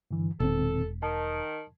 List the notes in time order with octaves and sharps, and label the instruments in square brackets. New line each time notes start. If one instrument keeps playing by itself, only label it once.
[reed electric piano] G2 D3 E3
[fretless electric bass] E1 [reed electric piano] A#2 D#3 C4 [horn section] A4
[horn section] D#3 [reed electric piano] A5